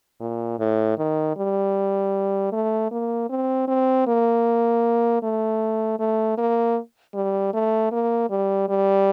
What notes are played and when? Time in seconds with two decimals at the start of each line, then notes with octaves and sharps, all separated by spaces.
0.20 A#2
0.59 A2
0.98 D#3
1.37 G3
2.52 A3
2.91 A#3
3.29 C4
3.68 C4
4.07 A#3
5.23 A3
5.99 A3
6.38 A#3
7.14 G3
7.53 A3
7.92 A#3
8.30 G3
8.69 G3